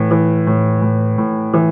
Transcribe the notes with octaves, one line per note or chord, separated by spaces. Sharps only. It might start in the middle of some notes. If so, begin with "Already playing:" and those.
Already playing: A2 E3
E3
A2
A2
A2
E3